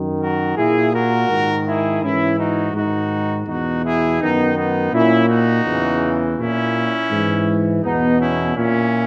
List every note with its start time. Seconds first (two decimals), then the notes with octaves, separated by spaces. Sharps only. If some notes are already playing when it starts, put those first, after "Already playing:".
Already playing: F#2 D#3
0.20 F#4 A#4
0.56 A#2 E4 G#4
0.94 F#4 A#4
1.29 G#2 D#3
1.65 E4 G#4
2.02 G#2 E3 C#4 E4
2.39 D#4 F#4
2.74 G#2 D#3 D#4 F#4
3.47 E2 B2 D#4 F#4
3.84 E4 G#4
4.20 F#2 D#3 B3 D#4
4.57 B3 D#4
4.92 A#2 C#4 E4
5.29 D#4 F#4
5.65 E2 C#3 E3
6.37 A#2 C#4 E4
7.11 G#2 E3
7.83 E2 B2 B3 D#4
8.20 C#4 E4
8.56 A#2 C#4 E4